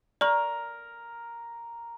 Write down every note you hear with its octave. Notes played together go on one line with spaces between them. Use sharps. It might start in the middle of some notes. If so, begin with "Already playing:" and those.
A#4 D5 C#6